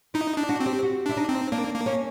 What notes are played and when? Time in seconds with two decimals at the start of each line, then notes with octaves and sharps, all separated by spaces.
0.14 D#4 E4
0.37 D4
0.49 F#4
0.60 C4
0.66 G4
0.83 F#4
1.06 D4 E4
1.17 D#4
1.29 C4
1.52 A#3 D4
1.74 A#3
1.86 C#4